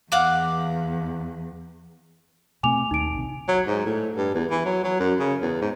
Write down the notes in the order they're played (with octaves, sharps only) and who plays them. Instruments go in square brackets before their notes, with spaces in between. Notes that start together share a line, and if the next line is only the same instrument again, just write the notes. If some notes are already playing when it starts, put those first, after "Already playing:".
[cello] E2 [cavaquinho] F5 F#5 D6
[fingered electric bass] B2 A3 C4 [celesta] G#5 D6 F7
[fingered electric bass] D#2 [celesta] D#4 D7
[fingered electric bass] A#1 C3
[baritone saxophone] F#3
G#2
A2
G2
E2
E3
F#3
F#3
F#2
C#3
E2
G#2